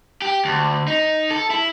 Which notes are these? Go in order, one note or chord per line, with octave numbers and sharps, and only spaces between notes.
G4
D2
D#4
A4
E4